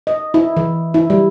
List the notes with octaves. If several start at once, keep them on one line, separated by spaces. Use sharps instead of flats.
D#5
E4
E3
E4
G3